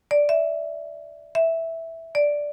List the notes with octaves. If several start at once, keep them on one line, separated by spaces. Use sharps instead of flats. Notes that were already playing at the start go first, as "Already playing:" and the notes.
D5
E5
E5
D5